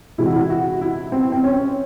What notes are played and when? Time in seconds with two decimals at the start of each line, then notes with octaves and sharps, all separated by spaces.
0.18 C3 E3 G#3 E4
0.26 F#4
0.32 E4
0.50 F#4
0.81 E4
1.12 C4
1.32 C4
1.44 C#4